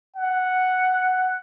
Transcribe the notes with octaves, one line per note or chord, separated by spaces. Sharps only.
F#5